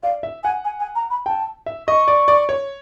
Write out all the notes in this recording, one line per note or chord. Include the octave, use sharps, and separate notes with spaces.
D5 F5
E5
F#5 G#5
G#5
G#5
A#5
B5
G5 A5
E5
D#5 C#6
D5
D5
C#5